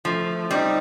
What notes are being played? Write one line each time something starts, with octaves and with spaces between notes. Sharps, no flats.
F3 A3
G3 C4 D#4